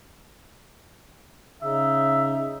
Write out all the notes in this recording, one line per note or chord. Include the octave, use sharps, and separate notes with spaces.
C#3 D#4 E5